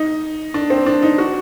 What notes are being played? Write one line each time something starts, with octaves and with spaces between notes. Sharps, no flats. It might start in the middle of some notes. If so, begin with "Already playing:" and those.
Already playing: D#4
D4
C4
D4
D#4
F#4